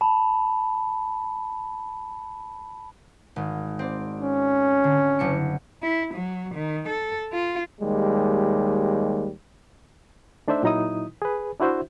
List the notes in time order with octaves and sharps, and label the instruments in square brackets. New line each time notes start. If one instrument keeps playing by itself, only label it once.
[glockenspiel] A5 B5
[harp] G#1
C4 D5
[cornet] C#4
[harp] D3
F#1 D4 C#7
[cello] E4
F#3
D#3
A4
F4
[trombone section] D#2 G3 G#3
[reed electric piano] A3 D4 D#4 C5 D5 E5
A#2 F#3 D#4 E4 D#6
G#4 B4
D4 E4 F#4 C5 E5